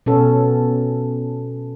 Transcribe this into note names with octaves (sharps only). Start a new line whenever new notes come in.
B2 C#4 A4